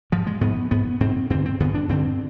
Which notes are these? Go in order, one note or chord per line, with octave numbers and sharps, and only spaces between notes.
G#2 F3
G#3
G#2 B3
G#2 B3
G#2 C4
G2 D3 C4
C4
G2 D3 B3
D4
G2 D3 C4